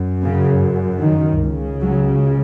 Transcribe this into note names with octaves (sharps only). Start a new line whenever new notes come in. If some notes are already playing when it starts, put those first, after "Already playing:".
Already playing: F#2
C#3
D#3
C#2 C#3
F#3